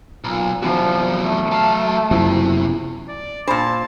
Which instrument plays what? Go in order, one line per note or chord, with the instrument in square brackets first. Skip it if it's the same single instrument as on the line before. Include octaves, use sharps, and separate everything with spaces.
[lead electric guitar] B1 [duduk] A#2
[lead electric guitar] F#2 C3 [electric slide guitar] E3 B3 F#4 [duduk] F3
[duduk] A3
[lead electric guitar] F#3 F5 [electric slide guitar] A5
[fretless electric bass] F#1 F#2 F3 [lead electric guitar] C3 [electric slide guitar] B3 E4
[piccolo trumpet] D5
[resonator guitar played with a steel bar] A#2 C5 [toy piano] D4 B5 [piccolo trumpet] A5